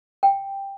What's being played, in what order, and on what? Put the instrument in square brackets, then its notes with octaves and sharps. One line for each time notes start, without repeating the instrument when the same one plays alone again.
[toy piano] G5